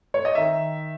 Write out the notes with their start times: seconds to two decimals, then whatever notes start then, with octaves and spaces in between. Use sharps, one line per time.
0.14 C#5
0.25 D#5
0.35 D#3 E5